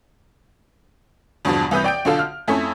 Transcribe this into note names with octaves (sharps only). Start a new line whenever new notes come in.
E2 G2 B2 D3 F3
C2 E3 B4 D#6 G6
D5 G5 G6 D7
B1 D3 F4 A4 A5
F6
F2 A3 C#4 E4 E5